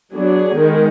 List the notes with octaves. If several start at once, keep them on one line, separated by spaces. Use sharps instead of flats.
F#3 B3 D4 G#4
D#3 G#3 B3